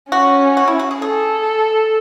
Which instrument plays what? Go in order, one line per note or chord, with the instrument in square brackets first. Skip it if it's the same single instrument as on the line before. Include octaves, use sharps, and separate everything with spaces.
[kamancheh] C#4 [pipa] F#4
[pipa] F#4
E4
F#4
G#4
[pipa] G#4 [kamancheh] A4